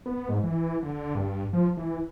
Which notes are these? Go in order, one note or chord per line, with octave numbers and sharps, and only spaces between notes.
B3
G#2
E3
D3
G2
F3
E3